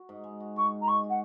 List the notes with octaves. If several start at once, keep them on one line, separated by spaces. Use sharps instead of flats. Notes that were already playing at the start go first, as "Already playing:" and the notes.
Already playing: F#4
G#2
G#3
F#4
G#2 C#6
G#2
A#5
G#3 C#6
F#4
F#5